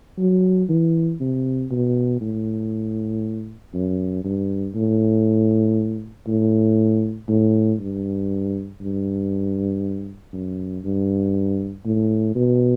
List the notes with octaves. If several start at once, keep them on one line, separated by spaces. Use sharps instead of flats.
F#3
E3
C3
B2
A2
F#2
G2
A2
A2
A2
G2
G2
F#2
G2
A2
B2